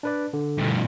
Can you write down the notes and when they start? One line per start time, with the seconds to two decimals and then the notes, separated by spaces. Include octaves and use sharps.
0.03 D4 B4 D5
0.33 D3
0.59 G2 B2